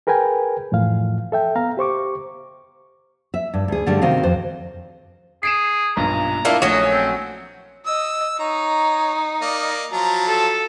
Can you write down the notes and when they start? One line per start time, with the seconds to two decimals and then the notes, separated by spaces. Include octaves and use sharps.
0.07 G#4 A#4 B4 G5 G#5
0.71 F2 A2 E3 F3 F5
1.32 A4 E5 G5
1.56 B3 F5 A#5
1.77 G4 C5 C#6 D6
3.34 E5
3.54 G2
3.68 D2 G#4
3.86 G2 D3 G3 A3
4.02 C3 D#3 C4 F#4 D#5 F5
4.23 F2 C5
5.43 G#4 C7 D7 E7
5.97 B1 G2 A#2 A#5
6.45 A3 A#3 D4 E4 F4
6.62 A#1 F#3 A3 C#4 D#5
6.91 C4
7.86 D#5 E6
8.39 D#4 C#5 A#5
9.42 A#3 D5 D#5
9.92 F3 F#3 A5 A#5
10.28 A4